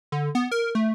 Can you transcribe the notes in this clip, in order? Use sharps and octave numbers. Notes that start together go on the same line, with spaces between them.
D3
B3
A#4
A3